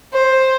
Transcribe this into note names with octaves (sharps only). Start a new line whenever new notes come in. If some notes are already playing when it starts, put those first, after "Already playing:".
C5